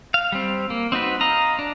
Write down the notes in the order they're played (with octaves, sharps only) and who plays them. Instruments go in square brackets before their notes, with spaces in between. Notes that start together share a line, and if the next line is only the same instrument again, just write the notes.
[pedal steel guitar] F5
G3 C4
A#3
C4 D#4 F#4 B4
D#5 F5 A#5
D4